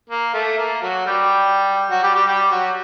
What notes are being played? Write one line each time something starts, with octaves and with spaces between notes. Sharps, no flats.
A#3
A3
A#3
F#3 F#4
G3 G4
F#3 F#4
G3 G4
G3 G4
G3 G4
F#3 F#4